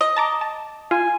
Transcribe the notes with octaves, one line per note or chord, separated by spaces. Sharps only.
D#5
A5 A#5 D6
A5
F4 G#5